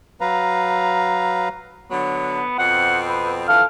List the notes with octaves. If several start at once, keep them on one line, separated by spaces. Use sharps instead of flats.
F#3 B4 F5 A#5
D3 F#3 B3
F2 B2 C4 F#5
B4
F2 D3 E3 A4 F5